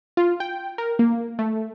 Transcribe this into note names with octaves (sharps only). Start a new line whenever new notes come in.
F4
G5
A#4
A#3
A3